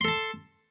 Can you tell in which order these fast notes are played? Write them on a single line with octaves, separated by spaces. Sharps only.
C6 A4 A5